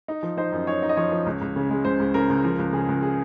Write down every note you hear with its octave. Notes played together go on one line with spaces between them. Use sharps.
D#4
F3
D#4 C5
F#2
D#4 C#5
D#4
D#5
F3 C#5
F3
C#2
C#2
C#3
G#3
C#2 C5
C#2
C#3 A#4
C#2
F3 A#4
C#2
C#3 G#4
C#2
G#4